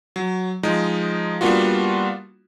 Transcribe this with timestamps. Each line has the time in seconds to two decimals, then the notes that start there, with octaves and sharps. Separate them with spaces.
0.16 F#3
0.63 F3 G#3 D#4
1.41 G3 A#3 B3 D4 F4 F#4